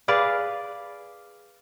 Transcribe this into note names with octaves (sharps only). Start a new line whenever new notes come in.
G#4 B4 D5 F5